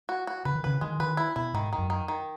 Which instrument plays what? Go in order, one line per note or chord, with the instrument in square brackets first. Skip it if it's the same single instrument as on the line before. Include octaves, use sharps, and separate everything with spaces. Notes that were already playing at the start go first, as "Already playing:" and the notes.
[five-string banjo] F#4
F#4
[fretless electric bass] C#3 [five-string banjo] B4
[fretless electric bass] D#3
[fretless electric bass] C#3 [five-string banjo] B4
[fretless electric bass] D#3 [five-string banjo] G#3
[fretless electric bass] D#3 [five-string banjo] B4
[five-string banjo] E4
[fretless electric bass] B2 [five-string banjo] E4
[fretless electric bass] G#2 [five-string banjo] D#3
[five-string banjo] D#3
[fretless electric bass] F#2
[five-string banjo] D#3
D#3